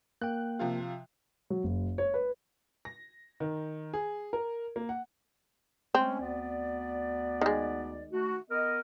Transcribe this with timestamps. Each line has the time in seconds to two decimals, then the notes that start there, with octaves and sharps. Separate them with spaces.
0.21 A#3 G5 F#6
0.59 C3 F3 F4
1.50 F#3
1.64 F#1
1.98 C#5
2.14 B4
2.85 A#6
3.40 D#3
3.94 G#4
4.33 A#4
4.76 A#3
4.89 F#5
5.95 G#3 A3 C4 C#4
6.21 D2 B3 D5
7.41 D#3 G#3
8.11 A3 F#4
8.51 B3 A#4 D#5